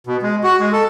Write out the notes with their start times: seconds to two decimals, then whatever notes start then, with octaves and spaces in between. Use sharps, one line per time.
0.07 B2
0.22 G#3
0.44 F#4
0.59 G#3
0.72 A4